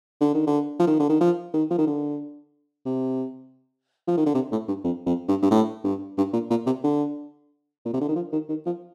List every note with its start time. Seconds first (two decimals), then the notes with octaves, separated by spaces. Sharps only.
0.21 D3
0.34 D#3
0.47 D3
0.80 F3
0.87 D#3
1.00 D3
1.10 D#3
1.21 F3
1.54 D#3
1.71 F3
1.78 D#3
1.87 D3
2.86 C3
4.07 F3
4.18 D#3
4.26 D3
4.35 C3
4.52 A2
4.68 G2
4.84 F2
5.06 F2
5.28 G2
5.42 G2
5.51 A2
5.84 G2
6.18 G2
6.33 A#2
6.50 A#2
6.66 C3
6.84 D3
7.86 A#2
7.93 C3
8.01 D3
8.09 D#3
8.16 F3
8.33 D#3
8.49 D#3
8.66 F3